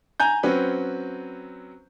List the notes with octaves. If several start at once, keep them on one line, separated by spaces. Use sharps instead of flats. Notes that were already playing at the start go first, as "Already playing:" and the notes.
G#5 A#5 G6
F#3 C4 C#4 B4